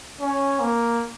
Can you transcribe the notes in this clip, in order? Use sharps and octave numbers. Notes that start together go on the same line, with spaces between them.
C#4
A#3